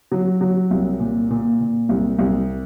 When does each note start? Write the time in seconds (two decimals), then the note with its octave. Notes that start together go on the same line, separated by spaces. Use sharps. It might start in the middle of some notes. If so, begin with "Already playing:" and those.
0.12 F#3
0.41 F#3
0.71 C2
1.00 A#2
1.30 A#2
1.60 A#2
1.89 C2
2.19 C2